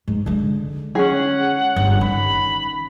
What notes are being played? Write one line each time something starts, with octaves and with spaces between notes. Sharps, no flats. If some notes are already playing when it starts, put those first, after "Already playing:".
G#2
D3 G#3
C#4 G#4 F#5
G1
D#3 B5